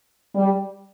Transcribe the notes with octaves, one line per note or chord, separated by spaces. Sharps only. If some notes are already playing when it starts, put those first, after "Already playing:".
G3